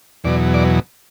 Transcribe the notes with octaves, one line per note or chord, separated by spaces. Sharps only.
E2 B2 F#3 D5
D5